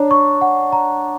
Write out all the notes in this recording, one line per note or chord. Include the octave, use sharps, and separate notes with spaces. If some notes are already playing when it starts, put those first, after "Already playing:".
Already playing: D4 C#5 A#5
C#6
F#5
A#5